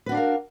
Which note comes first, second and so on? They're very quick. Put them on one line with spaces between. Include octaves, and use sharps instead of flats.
B4 F#4 D4 F5 A#4